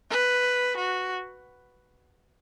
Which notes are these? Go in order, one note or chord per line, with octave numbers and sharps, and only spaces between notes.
B4
F#4